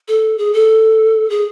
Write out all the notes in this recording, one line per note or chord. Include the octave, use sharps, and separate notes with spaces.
A4
G#4
A4
G#4